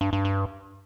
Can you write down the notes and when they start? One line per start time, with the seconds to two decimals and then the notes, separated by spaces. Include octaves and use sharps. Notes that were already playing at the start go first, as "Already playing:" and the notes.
0.01 G2
0.13 G2
0.25 G2